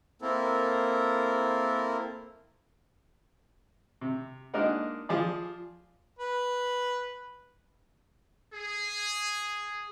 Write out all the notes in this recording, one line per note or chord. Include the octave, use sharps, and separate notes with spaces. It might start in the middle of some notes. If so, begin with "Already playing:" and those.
A#3 C4 E4 A4 A#4
C3
G#3 A#3 D4 D#4 A#4 F#5
F3 G#4 D5
B4
G#4